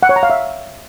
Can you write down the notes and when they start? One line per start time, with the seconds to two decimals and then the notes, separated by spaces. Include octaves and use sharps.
0.03 F#5
0.09 C#5
0.16 A#5
0.23 F5
0.30 E5